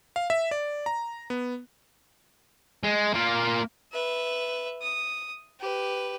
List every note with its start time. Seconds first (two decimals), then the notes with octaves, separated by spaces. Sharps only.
0.16 F5
0.30 E5
0.51 D5
0.86 A#5
1.30 B3
2.83 G#3
3.14 A#3 F4
3.92 B4 E5
4.82 D#6
5.60 G4 B4